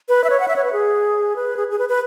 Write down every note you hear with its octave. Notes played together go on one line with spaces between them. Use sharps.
B4
E5
C#5
F#5
E5
C#5
B4
G#4
B4
G#4
G#4
B4
B4